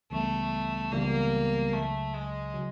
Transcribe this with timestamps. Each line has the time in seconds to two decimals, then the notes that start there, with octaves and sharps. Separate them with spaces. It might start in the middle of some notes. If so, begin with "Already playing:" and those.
0.11 C#2 C#3 E3 G3 A3 B3
0.91 C#2 C#3 E3 G3 A#3 B3
1.73 C#2 C#3 F#3 A3
2.14 G#3
2.54 C#3 F#3